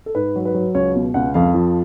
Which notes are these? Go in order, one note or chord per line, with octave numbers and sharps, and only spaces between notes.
A4
G#2 B4
F#3
B4
F#3
C#2 C#5
B2
C#2 F#5
F2 F5
F3